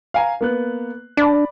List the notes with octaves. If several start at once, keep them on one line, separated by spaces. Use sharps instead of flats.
F5 G#5 A#5
A#3 B3 F#6
D4 D5 B5